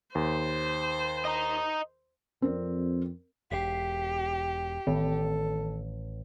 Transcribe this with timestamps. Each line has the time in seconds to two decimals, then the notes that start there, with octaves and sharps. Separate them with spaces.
0.15 D#2 C5
1.25 D#5 A#5
2.42 F2 C4 A#4 D5
3.51 E1 G4 B6 C7
4.87 A1 D#3 A4